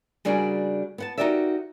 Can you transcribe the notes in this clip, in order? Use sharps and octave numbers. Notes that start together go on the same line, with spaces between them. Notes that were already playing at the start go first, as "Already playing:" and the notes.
C#3 G3 D4 F#4 G#4 A#4
B3 F#5 A5
D#4 F#4 G4 A#4 D5 E5